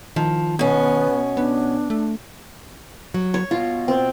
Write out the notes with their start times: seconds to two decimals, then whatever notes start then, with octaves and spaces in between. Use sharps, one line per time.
0.16 D#3 F3
0.59 B2 B3 C#4
1.37 B3 D4
1.90 A3
3.14 F#3
3.34 C#5
3.51 B2 F4
3.88 C4